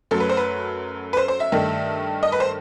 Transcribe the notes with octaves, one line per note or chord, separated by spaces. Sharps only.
F#2 F#3 A3 A4
B4
C5
B4
B4
C5
C5
E5
G2 D#3 A3
D#5
B4
C5